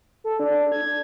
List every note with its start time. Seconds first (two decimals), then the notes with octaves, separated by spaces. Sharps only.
0.24 A4
0.40 D4
0.72 G#6